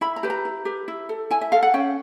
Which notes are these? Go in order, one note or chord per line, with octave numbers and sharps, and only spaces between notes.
E4 B5
A#5
G4 B4
A#5
E4
G4 B4
E4
A4
E4 G#5
E5
A4 F5
F#5
C#4 G5